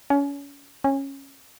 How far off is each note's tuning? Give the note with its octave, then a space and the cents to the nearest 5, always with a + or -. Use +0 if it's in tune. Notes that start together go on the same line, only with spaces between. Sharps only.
C#4 +30
C#4 -15